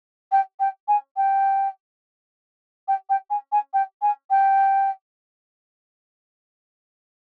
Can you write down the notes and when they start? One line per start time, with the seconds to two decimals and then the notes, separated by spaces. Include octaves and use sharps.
0.32 G5
0.60 G5
0.88 G#5
1.17 G5
2.88 G5
3.09 G5
3.30 G#5
3.52 G#5
3.73 G5
4.02 G#5
4.30 G5